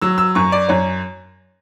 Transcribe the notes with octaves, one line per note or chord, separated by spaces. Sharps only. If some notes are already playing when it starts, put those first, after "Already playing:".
F#3 E6
E6
F#2 C#6
D5
F#2 C#5